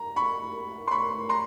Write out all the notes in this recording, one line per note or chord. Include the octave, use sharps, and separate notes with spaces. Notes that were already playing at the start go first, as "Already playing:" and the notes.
Already playing: A#5
B5 C#6
C6
B5 C#6
A#5 C6